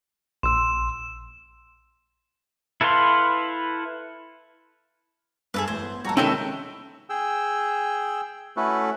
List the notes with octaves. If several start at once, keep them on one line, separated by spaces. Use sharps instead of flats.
A#1 C6 E6 E7
E4 A4 B4 F5 C6
G2 G#4 A4 B4
A1 C5 G#6
B3
A#1 G3 F#4 A4 A#5
C3 D#3 G#3 C#4 E4 F#4 A4 G5
G#4 G5 E6
A3 C#4 E4 F#4 A4 B4